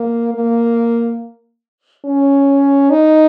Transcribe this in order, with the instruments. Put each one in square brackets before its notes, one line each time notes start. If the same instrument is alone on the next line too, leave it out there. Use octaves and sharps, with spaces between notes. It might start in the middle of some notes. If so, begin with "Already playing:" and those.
Already playing: [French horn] A#3
A#3
C#4
D#4